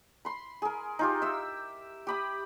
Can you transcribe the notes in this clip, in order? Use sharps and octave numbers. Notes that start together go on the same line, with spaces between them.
B5 C6
G#4 A#4
D#4 F4 G4
E5 E6
G4 B5 D#6